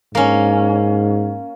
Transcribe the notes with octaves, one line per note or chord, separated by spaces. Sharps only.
G#2 A#3 C#4